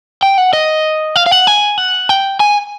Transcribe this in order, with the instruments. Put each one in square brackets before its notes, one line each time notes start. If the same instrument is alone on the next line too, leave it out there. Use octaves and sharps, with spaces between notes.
[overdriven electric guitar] G5
F#5
D#5
F5
F5
F#5
G#5
F#5
G5
G#5